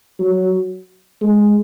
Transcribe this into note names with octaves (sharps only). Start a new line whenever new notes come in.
F#3
G#3